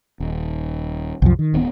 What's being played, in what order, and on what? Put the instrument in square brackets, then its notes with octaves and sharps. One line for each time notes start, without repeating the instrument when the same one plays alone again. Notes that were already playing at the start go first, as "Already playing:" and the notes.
[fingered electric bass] D#1
[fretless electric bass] C2 F#2 F3
D#3
[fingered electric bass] D1 B3